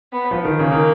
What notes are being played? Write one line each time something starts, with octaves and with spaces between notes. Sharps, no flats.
B3
F3
D#3
C#3 A#3
D#3